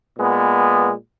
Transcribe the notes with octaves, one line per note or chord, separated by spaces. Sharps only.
A#2 G#3 B3